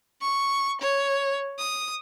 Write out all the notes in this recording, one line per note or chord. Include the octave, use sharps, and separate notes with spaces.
C#6
C#5
D#6